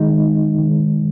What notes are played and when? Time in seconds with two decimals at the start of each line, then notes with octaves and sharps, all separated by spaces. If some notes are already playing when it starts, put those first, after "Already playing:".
Already playing: D#3 G#3 D#4
0.58 D#3 G#3